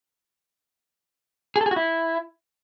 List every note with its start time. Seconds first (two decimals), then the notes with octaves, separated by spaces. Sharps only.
1.56 G#4
1.61 A4
1.66 G#4
1.71 F#4
1.76 E4